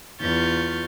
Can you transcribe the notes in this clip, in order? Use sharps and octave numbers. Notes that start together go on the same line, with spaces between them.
E2 F4 C#6 F6 G6 A6